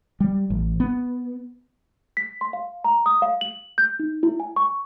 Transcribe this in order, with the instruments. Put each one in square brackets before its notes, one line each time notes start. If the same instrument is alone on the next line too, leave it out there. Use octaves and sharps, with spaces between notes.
[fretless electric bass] G3
A1
B3
[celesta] B6
C6
F5
A#5
D#6
F5
F#7
G6
D#4
E4
G#5
C#6